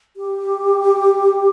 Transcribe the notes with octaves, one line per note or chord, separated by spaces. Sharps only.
G4